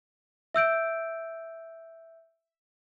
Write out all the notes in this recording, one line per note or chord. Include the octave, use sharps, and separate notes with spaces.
E5 E6 G6 D7